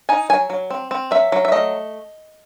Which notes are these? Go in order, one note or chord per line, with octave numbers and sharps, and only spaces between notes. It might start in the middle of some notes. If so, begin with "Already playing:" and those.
D#4 G#5
F#3 G#5
F#3
C4
C4
F#3 E5
F#3
E5
A3 D#5